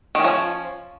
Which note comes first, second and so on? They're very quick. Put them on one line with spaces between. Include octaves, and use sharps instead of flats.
D#3 C#4 F3